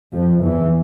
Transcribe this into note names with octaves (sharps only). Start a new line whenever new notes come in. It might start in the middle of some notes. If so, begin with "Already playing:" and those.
F2 F3
E2 E3